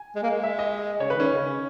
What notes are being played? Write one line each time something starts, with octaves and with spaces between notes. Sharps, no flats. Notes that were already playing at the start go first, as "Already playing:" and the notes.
Already playing: G#5
G#3
A#3
G#3
E5
D#5
C#3 C#5
D#3 B4
C#4
C#3